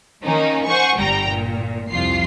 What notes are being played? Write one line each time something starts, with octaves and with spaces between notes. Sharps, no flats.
D#3 A#3 C#4 D#4
C5 F#5 G#5 C#6
G1 G3 G5 A#5 A#6
A#2
C2 F2 F4 C7